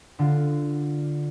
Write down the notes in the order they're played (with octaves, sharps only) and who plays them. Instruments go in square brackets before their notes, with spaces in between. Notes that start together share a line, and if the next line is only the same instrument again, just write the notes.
[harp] D3 F4